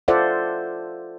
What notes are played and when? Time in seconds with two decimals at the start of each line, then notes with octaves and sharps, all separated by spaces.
0.08 F4 A4 C5 D5 E5 F#5